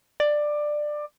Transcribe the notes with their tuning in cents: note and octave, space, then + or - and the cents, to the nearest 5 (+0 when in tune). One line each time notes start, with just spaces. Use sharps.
D5 +15